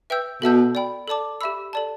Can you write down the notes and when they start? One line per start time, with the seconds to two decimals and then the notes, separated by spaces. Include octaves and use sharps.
0.10 B4 E5 G5 E6 G6
0.42 B2 A4 E5 A5 E6 G6
0.75 D5 G5 B5
1.08 A4 D5 A5 D6
1.41 G4 E5 B5 E6
1.73 A4 D5 A5